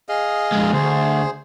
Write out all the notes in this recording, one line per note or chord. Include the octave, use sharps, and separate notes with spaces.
G#4 D#5 F5
F2 G#3
D2 G#4 C5